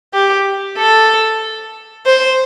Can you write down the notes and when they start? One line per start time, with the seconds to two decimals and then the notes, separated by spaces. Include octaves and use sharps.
0.14 G4
0.78 A4
2.06 C5